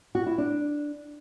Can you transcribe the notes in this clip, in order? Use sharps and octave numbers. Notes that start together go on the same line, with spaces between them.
F#4
E4
D4